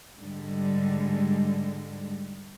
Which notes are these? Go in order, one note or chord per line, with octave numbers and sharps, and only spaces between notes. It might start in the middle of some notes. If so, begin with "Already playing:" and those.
G#2 D3 G3 G#3